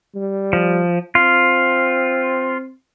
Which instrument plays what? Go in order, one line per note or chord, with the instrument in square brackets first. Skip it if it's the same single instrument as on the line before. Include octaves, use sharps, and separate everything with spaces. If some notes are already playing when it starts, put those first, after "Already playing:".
[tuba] G3
[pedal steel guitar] F3
[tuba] C4 [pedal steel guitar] F4